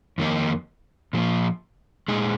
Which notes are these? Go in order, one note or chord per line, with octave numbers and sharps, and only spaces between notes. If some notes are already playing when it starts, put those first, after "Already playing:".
F2 D#3 A#3 D#4
A#2 F3 A#3 F4
A#2 G#3 D#4 G#4